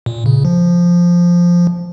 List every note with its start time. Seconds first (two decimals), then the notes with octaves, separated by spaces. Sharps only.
0.06 A#2
0.26 C#3
0.45 F3